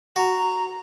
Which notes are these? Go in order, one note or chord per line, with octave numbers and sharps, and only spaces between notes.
F#4 A#5